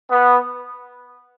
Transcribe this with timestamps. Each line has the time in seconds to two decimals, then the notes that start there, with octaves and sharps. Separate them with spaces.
0.10 B3